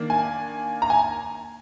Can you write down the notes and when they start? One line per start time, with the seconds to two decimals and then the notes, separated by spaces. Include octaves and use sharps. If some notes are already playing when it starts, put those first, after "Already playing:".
Already playing: D#3 A#3 D4
0.10 G#5
0.82 A#5
0.90 G#5